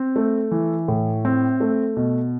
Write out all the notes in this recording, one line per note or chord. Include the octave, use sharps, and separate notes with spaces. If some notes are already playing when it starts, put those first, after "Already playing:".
Already playing: C4
A3
E3
A2
C4
A3
B2